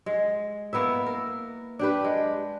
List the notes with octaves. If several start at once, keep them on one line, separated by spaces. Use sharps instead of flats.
G#3
A#3 B3 E4 E5
A#4
D4 G4 B4
G#3